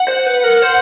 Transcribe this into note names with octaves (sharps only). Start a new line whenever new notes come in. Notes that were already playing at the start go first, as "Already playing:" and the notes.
Already playing: F#5
C5
B4
A#4
C5